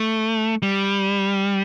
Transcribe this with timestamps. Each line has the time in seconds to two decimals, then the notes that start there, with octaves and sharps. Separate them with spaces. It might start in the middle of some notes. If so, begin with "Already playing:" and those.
Already playing: A3
0.62 G3